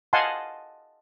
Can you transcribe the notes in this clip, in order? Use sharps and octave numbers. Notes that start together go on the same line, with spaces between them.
D#5 F5 F#5 G#5 A5 C6